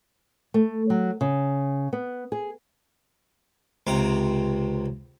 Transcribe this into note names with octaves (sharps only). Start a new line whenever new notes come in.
A3
F#3
C#3
B3
G#4
C#2 C3 A#5